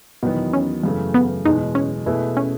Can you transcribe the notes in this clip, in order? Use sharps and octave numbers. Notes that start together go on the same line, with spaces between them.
E2 B2 D#3 F#3 B3
C#4
F#2 C#3 E3 A3
B3
E2 B2 G#3 D#4
C#4
B2 A3 E4 G#4 B4
C#4